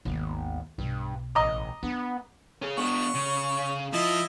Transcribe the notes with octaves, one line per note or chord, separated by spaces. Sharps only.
G#1 D#2 B3
B1 G2
A1 D#5 A#5 D6
B3 D4
C#4 G#4
B3 D4 C#6
C#3
F3 E4 D#5 A5